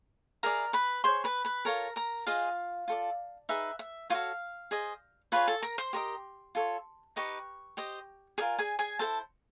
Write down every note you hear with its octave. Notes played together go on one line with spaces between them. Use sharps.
E4 G#4 A#4 D5 A#5
B4 B5
G#4 C5 C#5 C6
B4 B5
B4 B5
F4 A4 A#4 C#5 A#5
A#4 A#5
F4 G#4 C5 D#5 F5
F4 A4 D5
D#4 G#4 B4 E5
E5
F4 F#4 A4 C#5 F5
G#4 C5 D#5
F4 G#4 B4 C#5 B5
A4 A5
A#4 A#5
C5 C6
G4 A#4 D#5
F4 A4 C#5
D#4 G4 B4 D#5 C#6
G4 C5 D#5
F4 G#4 A#4 D5 G#5
G#4 G#5
G#4 G#5
E4 G#4 A4 C5 A5